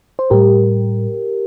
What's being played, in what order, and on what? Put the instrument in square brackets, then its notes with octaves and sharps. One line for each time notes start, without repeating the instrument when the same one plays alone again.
[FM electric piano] C5
A2 G3 G4 A#4